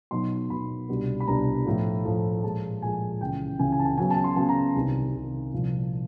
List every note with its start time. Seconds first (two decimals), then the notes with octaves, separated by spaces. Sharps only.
0.11 B2 F#3 B3 D#4 C6
0.50 B2 F#3 B3 D#4 B5
0.89 C2 B2 G3 B3 D4
1.20 B5
1.27 C2 B2 G3 B3 D4 A#5
1.66 A2 F3 A3
2.05 A2 F3 A3
2.44 A#2 F3 G#3 A5
2.82 A#2 F3 G#3 G#5
3.21 C#2 C#3 E3 G5
3.59 C#2 C#3 E3 G#5
3.72 G#5
3.79 A5
3.85 G#5
3.98 C#3 F#3 B3 G#5
4.11 A5
4.24 C6
4.36 C#3 F#3 B3 A5
4.49 A#5
4.75 C2 C3 D#3
5.14 C2 C3 D#3
5.53 C2 A#2 F3